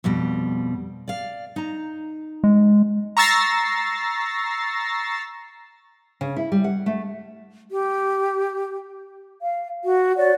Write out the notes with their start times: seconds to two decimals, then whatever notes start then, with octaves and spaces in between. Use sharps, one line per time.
0.04 F2 B2 G3
1.08 D5 F5
1.56 D#4 A#5
2.44 G#3
3.17 A#5 C#6 E6 A6 A#6 C7
6.21 C#3
6.36 E4
6.52 G3
6.64 F#5
6.86 A3
7.70 G4
9.40 F5
9.84 F#4
10.17 F#4 C#5 D5